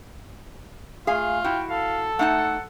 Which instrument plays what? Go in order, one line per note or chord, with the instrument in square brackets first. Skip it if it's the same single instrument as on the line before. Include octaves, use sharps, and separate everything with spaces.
[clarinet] A3 [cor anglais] F4 [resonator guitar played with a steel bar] G#4 F5 G#5
[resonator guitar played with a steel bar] E4 F#4 [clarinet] G5
[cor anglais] A4 [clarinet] F5
[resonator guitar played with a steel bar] A3 D#4 A5 [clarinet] F#5